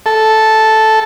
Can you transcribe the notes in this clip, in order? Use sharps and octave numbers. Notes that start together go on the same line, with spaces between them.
A4